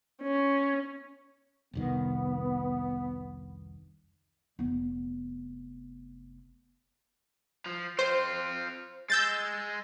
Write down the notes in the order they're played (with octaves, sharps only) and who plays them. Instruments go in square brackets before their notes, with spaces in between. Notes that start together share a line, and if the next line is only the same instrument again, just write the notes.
[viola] C#4
[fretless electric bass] F1 C2 D#3 [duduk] B3
[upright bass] F1 B3
[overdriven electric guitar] F3
[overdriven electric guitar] C4 F4 [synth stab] C5
[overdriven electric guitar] G#3 [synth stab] E6 G6 A6